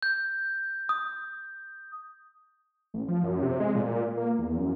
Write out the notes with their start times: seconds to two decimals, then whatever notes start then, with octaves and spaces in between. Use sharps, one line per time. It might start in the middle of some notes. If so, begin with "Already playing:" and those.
0.03 G6
0.89 D#6
2.94 A1
3.08 F3
3.24 F#2
3.43 C3
3.60 G#3
3.75 A#2
4.17 A#3
4.39 E2
4.57 F#2